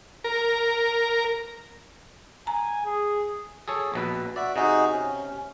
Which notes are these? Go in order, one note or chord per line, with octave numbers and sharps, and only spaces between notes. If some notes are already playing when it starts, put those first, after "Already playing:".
A#4
G#5 A#5
G#4
G#4 A4 C#5
A#1 B2 B4
F#4 D5 E5
C3 D#4 F#4 G#4
C#4